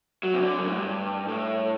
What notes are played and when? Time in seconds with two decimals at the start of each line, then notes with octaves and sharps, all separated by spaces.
0.23 F#3
0.34 C3
0.41 D3
0.58 F#2
0.67 A2
0.75 G2
1.28 A2